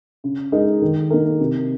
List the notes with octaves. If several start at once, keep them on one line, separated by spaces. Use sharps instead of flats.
C#3
G#3 D#4 A#4
D#3
A#3 D#4 A#4
C3